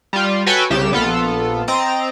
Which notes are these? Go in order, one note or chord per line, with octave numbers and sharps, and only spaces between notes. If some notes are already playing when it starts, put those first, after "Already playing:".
G3 F4
F#4 A4 B4 C#5 G5 G#5
C2 C#3 G4 E7
A#1 B3 F4 A4
C4 D#5 A#5 A6 D7